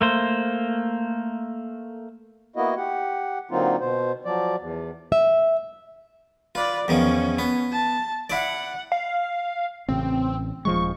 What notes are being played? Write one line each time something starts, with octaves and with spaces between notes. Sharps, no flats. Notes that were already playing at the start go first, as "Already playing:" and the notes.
A3 A#3 C5
A#3 B3 E4 F#4 D#5
G4 F#5
D3 F#3 A#3 C4 D#4 F4
B2 C5
F3 F#3 D5
E2
E5
F4 B4 D5
E2 D#3 F3 C#4
B3
A5
E4 D5 F#5
F5
A1 C#3 C4
D#1 F3 G#3 C#6